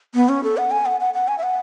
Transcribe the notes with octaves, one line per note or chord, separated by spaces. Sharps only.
B3
C#4
A4
F#5
G#5
F#5
F#5
F#5
G#5
E5
F#5